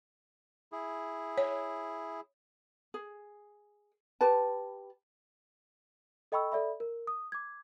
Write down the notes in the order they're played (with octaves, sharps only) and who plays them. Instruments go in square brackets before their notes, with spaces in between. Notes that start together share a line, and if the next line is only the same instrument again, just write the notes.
[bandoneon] E4 G#4
[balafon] C#5
[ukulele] G#4
G4 B4 A5
[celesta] A4 D#5 G5 B5 C#6 E6
A4 D5 E5 B5
A#4
D#6
D6 G#6